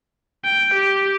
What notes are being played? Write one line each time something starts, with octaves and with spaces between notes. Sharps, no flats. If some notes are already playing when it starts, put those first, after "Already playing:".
G5
G4